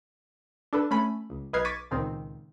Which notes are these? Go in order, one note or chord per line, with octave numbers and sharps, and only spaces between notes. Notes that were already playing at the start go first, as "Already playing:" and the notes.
D4 A4 B4
A3 C#4 B5
C#2
B1 B4 D#5 F6 G#6 C7
C#6 D6 G#6 A6 B6 D#7
C#2 A#2 D#3 C4